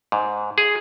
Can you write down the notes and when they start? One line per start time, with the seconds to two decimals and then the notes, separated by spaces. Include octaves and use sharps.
0.12 G#2
0.58 G#4